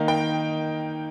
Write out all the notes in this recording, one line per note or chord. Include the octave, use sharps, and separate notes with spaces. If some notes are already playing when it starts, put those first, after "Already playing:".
Already playing: D#3 A#3 D#4
G5